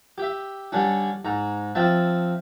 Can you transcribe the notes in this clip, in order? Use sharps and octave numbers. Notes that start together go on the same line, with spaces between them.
G4 E5
D3 G3 C#4 D4
G#2 A#5
F3 C4 E5 A5